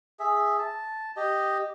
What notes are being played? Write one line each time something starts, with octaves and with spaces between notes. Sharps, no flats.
G#4 E5
A5
G4 D#5